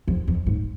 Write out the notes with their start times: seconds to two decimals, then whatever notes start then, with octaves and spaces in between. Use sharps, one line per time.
0.08 F2
0.27 F2
0.46 G#2